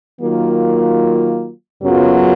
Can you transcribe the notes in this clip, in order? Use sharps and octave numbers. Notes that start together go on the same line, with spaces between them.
D#3 F#3 A#3 F4
F#2 C#3 F#3 B3 F4